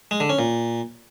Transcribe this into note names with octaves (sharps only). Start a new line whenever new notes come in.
G#3
D3
C#4
A#2